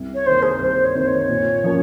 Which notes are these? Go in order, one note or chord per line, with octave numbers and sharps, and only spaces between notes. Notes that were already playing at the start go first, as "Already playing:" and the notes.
Already playing: C2
C#5
C3 D#3 A#3 C5
G#4
A#4
C2 C5
C#5
C3 D#3 A#3 C5
C#5
A#2
F3 A#3 C#4